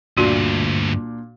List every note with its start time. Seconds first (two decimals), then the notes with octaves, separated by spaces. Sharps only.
0.18 D2 G2 A#2 D4 F#4 C6